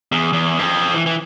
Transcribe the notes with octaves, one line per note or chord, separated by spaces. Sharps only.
E2
E2
G2
F2
E3
E3